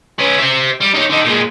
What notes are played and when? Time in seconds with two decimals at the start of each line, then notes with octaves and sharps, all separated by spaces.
0.19 C#4 B4
0.39 C5 E5
0.80 G3
0.94 D#4 C#5
1.09 D3 D#4
1.24 A#2 G#3